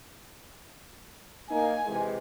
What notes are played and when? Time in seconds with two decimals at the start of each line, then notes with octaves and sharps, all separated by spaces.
1.51 A#3 D#4 G#5
1.86 C3 E3 G#3